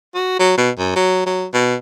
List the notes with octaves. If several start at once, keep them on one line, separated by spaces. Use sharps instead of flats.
F#4
F#3
B2
F#2
F#3
F#3
B2